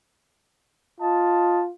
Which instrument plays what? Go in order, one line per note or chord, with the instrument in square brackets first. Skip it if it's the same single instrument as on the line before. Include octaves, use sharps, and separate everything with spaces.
[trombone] F4 [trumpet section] D#5 A5